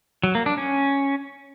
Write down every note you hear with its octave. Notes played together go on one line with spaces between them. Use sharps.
F#3
A#3
D4
C#4